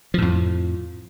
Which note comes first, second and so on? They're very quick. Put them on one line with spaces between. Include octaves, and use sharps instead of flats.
F3 A2 F2